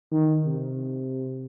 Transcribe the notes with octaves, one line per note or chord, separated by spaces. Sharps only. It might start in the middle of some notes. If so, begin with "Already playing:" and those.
D#3
C3